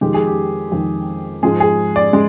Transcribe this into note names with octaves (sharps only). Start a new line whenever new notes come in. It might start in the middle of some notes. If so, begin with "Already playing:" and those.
F2 D#3 G#3 G4
G#4
G4
F2 D#3 G#3
G#2 F3 G#3 G#4
G#4
D5
G#3